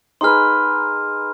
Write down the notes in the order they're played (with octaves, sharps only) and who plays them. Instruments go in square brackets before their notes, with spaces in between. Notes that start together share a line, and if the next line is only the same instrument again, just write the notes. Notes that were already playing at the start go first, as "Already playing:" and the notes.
[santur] D#4 G#4 B4 [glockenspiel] C6 F6